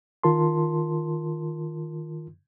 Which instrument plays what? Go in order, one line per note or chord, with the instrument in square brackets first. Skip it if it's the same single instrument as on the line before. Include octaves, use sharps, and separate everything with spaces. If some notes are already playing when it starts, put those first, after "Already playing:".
[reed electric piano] D#3 F4 A#4 A5 C6